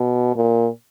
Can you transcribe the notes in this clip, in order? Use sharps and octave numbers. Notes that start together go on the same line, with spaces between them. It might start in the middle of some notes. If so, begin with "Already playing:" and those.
Already playing: B2
A#2